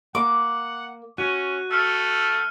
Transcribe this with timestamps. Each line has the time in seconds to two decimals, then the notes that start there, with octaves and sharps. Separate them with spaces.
0.15 A#3 F#5 D6
1.18 C#4 F#4 F#6 D#7
1.71 A3 E6 F6 C#7